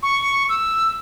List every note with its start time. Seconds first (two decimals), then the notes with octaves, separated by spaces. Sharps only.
0.03 C#6
0.49 E6